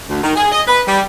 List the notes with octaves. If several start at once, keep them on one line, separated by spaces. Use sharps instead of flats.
D2
D#3
G#4
D#5
B4
G3